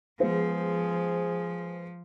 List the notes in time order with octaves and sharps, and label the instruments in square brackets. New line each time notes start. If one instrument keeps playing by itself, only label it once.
[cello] F3 [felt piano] G#3 B3 C5 [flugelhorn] G#4